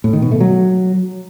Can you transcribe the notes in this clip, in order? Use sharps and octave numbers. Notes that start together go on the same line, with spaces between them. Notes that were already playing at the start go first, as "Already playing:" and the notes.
A2
D#3
B2
A3
F#3